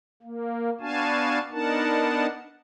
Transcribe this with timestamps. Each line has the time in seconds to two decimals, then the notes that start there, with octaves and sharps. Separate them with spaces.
0.23 A#3
0.80 B3 D4 F#4 F5 G#5 A5
1.51 B3 D4 D#4 A#4 F#5 A5